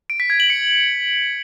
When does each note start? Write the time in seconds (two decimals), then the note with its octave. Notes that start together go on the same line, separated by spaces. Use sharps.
0.10 D7
0.20 B6
0.30 G#6
0.40 F#7
0.50 C#7